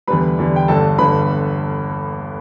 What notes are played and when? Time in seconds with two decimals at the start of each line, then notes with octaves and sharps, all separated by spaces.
0.08 E2 D3 G3 B4 B5
0.38 E2 D3 G3
0.56 G5
0.68 G1 G2 D3 A4 A5
0.98 G1 G2 D3 B4 B5